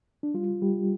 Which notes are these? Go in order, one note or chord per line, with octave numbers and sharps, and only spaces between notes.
D4
G3 F4
G3 G4